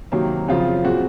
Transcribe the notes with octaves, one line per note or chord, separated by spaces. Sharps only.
C3 D#3 F#3 A#3
F#2 C#3 F3 C4 F4
A#2 G#3 C4 F#4